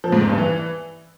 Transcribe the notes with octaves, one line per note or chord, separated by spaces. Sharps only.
F3
G#2
E2
G2
E3